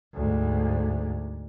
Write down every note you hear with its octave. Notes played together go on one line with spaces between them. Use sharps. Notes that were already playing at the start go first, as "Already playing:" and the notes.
D2 G#2